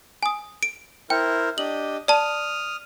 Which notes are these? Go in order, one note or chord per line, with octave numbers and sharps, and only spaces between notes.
G#5 D#6
D7
E4 A#4 C5 G5
D4 G4 D#5 F#7
D5 A5 D#6 F6